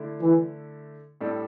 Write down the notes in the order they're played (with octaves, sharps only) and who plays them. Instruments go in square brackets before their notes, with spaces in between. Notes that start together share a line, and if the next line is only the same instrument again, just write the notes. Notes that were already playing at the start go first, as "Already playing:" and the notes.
Already playing: [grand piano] D3 A3 E4
[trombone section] E3
[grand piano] A2 G3 D4 A4